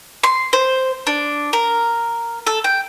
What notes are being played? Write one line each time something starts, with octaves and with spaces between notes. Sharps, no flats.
C6
C5
D4
A#4
A4
G5